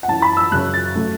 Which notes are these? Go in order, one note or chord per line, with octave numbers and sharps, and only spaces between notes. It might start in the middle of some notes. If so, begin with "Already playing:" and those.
F#5
F#2 E3 C#4 A5
B5
E6
F#2 C#3 F#3 C#4 F#6
A6
F#3 A3 C#4